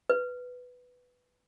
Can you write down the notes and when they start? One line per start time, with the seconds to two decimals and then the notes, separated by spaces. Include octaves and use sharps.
0.10 B4